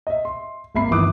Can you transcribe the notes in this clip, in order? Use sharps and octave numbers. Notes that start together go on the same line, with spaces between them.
D#5 E5
C6
G#1 A#3 E5 B5 C7
G1 D#3 E3 D6 D#6 F#6